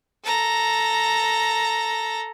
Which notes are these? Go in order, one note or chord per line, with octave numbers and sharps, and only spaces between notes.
A4 A#5